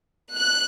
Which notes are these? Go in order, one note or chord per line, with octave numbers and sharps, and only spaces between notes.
F#6